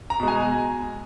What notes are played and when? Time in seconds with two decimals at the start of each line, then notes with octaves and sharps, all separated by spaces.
0.10 A#5
0.20 B2 G#3
0.28 G#5